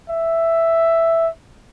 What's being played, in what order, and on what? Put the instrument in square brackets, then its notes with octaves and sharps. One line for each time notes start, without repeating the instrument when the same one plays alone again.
[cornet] E5